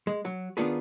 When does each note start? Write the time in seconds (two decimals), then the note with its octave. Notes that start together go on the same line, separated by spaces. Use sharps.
0.07 G#3
0.25 F#3
0.57 D#3 B3 D4 F4 G#4 B4